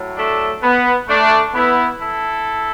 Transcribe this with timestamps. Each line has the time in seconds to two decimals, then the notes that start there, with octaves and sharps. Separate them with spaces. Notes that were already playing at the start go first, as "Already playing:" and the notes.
Already playing: A2 F#3
0.17 A3 D4
0.62 B3
1.09 A3 D4
1.55 B3 E4
2.00 E4 A4